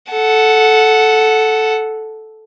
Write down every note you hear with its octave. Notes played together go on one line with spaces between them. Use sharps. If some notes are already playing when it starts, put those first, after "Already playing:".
A4 F#5